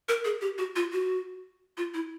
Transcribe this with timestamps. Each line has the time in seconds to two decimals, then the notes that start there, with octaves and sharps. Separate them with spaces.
0.09 A#4
0.25 G#4
0.41 G4
0.58 F#4
0.76 F4
0.93 F#4
1.77 F4
1.94 E4